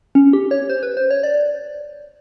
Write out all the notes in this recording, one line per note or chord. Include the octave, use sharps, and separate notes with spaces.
C#4
G4
C#5
C5
B4
C5
C#5
D5